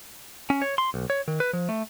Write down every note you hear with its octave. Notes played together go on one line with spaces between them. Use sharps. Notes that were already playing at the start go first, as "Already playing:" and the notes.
C#4
C#5
C6
B1
C#5
D#3
B4
F3
A3